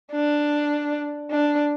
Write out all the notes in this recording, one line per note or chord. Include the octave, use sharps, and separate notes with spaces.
D4
D4